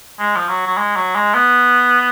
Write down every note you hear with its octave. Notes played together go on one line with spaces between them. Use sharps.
G#3
F3
F#3
F#3
G#3
F#3
G#3
B3